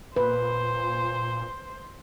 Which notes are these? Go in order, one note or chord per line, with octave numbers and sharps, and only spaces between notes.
A#2 B4 C5